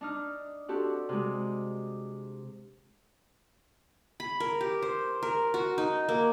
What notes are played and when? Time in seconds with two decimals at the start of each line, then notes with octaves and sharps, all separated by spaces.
0.01 D4 D#4 F6
0.68 C4 D4 F#4 G4 A4
1.09 C3 G#3
4.20 B5
4.40 A#4
4.61 G4
4.82 C5
5.23 A#4
5.54 F#4
5.78 D#4
6.09 A#3